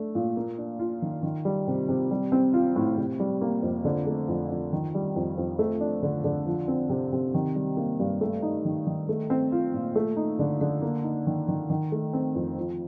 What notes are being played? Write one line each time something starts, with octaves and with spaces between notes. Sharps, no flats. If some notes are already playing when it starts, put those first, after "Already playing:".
Already playing: A3 D4
A#2
A#3
D4
F4
D#3
D#3
G3
C3
C3
G3
C4
F4
A2
C3
G3
A#3
F2
D3
A3
F2
F2
D#3
G3
F2
F2
A3
D4
D3
D3
F3
C4
C3
C3
D#3
G3
A#3
G2
A3
D#4
D#3
D#3
A3
C4
F4
A#2
A3
D#4
D3
D3
A#3
D#4
D#3
D#3
D#3
A3
C4
F2
F3